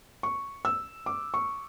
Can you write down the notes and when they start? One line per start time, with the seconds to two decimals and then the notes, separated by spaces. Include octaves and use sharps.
0.23 C#6
0.65 E6
1.06 D6
1.34 C#6